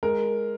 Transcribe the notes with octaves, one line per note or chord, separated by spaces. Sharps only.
G#3 A#4